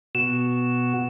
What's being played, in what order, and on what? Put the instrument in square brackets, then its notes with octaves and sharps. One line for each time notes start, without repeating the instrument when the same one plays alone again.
[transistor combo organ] B2 F#4 [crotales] E7